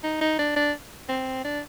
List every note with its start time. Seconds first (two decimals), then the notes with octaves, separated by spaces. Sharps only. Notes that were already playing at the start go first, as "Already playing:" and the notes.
0.04 D#4
0.21 D#4
0.39 D4
0.56 D4
1.09 C4
1.45 D4